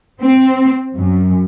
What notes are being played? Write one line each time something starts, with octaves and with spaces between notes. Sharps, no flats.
C4
F#2